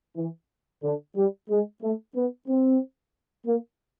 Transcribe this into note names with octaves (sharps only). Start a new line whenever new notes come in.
E3
D3
G3
G#3
A3
B3
C4
A#3